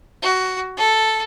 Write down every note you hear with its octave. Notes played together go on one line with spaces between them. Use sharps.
F#4
A4